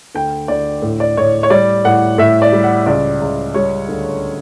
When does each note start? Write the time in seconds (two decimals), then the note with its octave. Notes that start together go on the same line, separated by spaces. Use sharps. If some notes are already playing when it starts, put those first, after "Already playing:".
0.15 D2 G5
0.48 D2 D5
0.82 A2
1.00 D5
1.17 A2 C#5
1.43 C#5
1.50 G3 D5
1.85 A2 F#5
2.18 A2 E5
2.42 D5
2.53 G3
2.64 F#5
2.86 C#2 D5
3.22 C#2
3.54 G3 C#5
3.89 D2